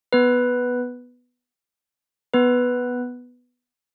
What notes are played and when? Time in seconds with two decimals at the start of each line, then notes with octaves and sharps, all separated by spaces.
0.13 B3 B4
2.33 B3 B4